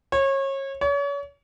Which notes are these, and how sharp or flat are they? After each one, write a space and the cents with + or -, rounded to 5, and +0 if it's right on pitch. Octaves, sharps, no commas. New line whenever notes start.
C#5 -30
C#5 +35